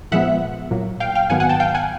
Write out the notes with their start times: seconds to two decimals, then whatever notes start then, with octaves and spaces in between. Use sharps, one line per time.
0.11 A#2 F3 G#3 B3 E5 F#5
0.71 A#2 F#3 A#3
1.00 F5 G5
1.15 F5 G5
1.30 G#2 D#3 F#3 B3 F#5 G#5
1.40 F#5 G#5
1.49 G5 A5
1.60 F5 G5
1.74 F#5 G#5